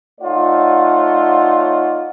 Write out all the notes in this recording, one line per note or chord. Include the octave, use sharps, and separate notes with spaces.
A3 D#4 F4 C#5 D5 F#5